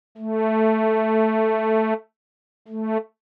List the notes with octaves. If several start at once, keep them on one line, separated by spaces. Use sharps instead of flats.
A3
A3